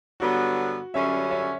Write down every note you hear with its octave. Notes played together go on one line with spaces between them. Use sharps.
G2 D3 F#3 B3 F#4
F#2 D3 G3 C#4 C#5 E5
C#5 E5